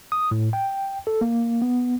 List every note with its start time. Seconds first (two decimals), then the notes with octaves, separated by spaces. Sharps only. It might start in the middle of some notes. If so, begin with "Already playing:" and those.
0.12 D#6
0.31 A2
0.53 G5
1.07 A4
1.21 A#3
1.62 B3